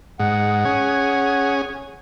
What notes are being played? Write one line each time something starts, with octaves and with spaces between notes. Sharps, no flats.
G#2 F#5
C#4 G#4